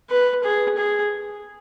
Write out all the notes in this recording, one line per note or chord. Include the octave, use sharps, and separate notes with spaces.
B4
G#4
G#4